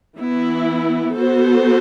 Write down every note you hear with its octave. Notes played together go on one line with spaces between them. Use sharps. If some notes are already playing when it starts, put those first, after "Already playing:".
E3 B3 E4
B3 F#4 A4 C5